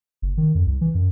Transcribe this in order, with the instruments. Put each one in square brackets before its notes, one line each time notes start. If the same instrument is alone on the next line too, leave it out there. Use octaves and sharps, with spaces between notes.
[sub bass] F#1
D#3
F2
C2
E3
F#2